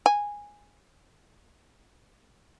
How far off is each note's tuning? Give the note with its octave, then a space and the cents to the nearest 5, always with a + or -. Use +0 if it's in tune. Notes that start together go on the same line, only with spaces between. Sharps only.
G#5 -10